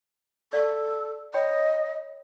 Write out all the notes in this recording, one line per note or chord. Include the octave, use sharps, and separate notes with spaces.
A4 D5 F5
C#5 D#5 G5 B5